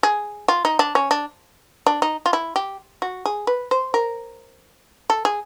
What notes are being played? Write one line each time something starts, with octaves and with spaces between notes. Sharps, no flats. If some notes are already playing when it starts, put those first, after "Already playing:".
G#4
F4
D#4
D4
C#4
D4
D4
D#4
F4
E4
G4
F#4
G#4
B4
C5
A#4
A4
G#4